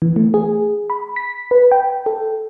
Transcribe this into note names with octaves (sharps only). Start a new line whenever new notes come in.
E3
A3
G#4
B5
B6
B4
G5
A4